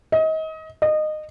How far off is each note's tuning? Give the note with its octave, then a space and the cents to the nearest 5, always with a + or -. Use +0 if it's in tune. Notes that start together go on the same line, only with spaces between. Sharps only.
D#5 +30
D#5 -20